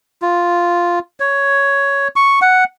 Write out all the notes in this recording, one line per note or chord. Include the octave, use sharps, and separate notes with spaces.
F4
C#5
C#6
F#5